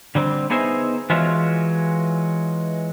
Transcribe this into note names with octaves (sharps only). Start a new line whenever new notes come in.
D3 G3 C4
B3 D#4 G#4 C5 E5
E3 F#3 G#3 F4 E5